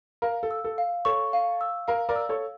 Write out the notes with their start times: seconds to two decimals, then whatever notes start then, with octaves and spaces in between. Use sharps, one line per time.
0.22 A#4 F5
0.43 A4
0.51 E6
0.64 A4
0.78 F5
1.05 A4 C#5 C#6
1.33 F5
1.61 E6
1.88 A#4 F5
2.09 A#4 D5
2.16 E6
2.29 A4 C#5